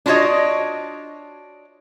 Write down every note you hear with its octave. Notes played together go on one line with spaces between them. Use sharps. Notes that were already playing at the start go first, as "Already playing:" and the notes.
D4 F4 F#4 C#5 D#5